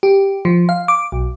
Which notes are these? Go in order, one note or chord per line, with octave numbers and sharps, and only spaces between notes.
G4
F3
F5
D6
B1